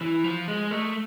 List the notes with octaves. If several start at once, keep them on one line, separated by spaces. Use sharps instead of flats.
E3
F3
G#3
A3